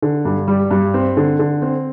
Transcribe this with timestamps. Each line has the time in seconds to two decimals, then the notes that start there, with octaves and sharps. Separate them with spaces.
0.02 D3
0.25 G2
0.48 G3
0.71 G2
0.94 C4
1.17 D3
1.39 D3
1.62 C4